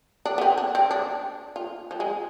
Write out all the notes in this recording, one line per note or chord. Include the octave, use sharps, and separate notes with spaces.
D4
B3
C4
D4
C4
D4
F4
F3
G#3